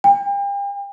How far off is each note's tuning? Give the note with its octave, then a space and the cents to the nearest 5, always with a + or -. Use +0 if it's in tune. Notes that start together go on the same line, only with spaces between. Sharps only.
G5 +40